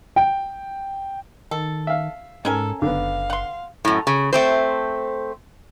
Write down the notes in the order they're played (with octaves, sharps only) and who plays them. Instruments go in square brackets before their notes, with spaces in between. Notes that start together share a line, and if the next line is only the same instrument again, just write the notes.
[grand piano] G5
[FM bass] D#3 [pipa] A4
[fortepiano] E5 F5
[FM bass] G#2 [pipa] C#4 A#4 G#5 [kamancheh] A4
[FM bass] F#1 [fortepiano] D3 B3 [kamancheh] F5
[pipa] F#5 C6
[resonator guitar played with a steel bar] F#2 A2
C#3
A3 C4 C5